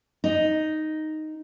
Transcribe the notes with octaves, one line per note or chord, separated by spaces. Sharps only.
D#4